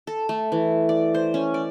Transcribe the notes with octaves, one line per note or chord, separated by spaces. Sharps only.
A4
A3
E3
D5
C5
C#4
D5